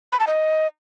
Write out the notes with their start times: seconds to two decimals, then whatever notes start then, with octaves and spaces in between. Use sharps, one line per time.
0.12 B5
0.20 A5
0.27 D#5